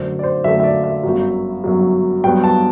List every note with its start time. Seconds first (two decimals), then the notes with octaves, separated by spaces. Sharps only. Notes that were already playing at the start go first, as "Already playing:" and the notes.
Already playing: F#2 D3 A3 C5
0.19 D5
0.24 C5
0.44 F#2 D3 A3 E5
0.60 E5
0.64 D5
0.84 E5
1.03 G1 F#2 F#3
1.64 G1 F#2 F#3
2.24 G2 F#3 B3 G5
2.44 A5